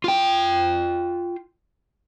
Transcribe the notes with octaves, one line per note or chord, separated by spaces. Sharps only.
F4 G5